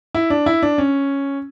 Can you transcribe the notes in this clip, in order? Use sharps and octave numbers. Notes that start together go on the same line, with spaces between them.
E4
D4
E4
D4
C#4